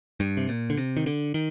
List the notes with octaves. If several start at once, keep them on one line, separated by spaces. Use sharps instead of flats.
G2
C3
A#2
D3
C3
D#3
D3
D#3